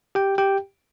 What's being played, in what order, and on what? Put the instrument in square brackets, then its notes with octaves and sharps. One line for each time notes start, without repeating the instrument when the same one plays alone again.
[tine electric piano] G4 G5
G4 G5